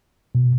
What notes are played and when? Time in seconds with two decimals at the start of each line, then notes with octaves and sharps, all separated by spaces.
0.35 B2